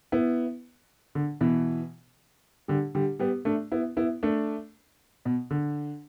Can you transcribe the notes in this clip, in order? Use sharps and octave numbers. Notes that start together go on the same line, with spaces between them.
B3 E4
D3
B2 E3
D3 G3
D3 G3
G3 B3
A3 D4
B3 E4
B3 E4
A3 D4
B2
D3